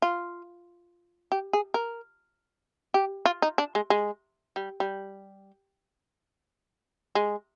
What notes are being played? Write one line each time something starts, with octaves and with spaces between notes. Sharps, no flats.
F4
G4
G#4
A#4
G4
F4
D#4
D4
G#3
G#3
G3
G3
G#3